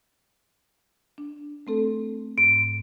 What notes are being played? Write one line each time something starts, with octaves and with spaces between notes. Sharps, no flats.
D4
A3 C4 A4
G#2 D7